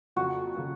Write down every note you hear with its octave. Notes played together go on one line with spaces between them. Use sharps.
F2 C#3 F#3 A#3 F#4
C#3 F#3 A#3